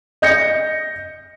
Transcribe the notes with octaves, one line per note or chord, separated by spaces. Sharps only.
D#5 G6 A#6 C#7